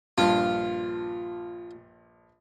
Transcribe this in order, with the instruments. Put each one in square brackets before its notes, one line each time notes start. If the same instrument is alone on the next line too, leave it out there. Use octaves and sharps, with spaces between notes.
[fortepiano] A#1 G2 [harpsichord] F4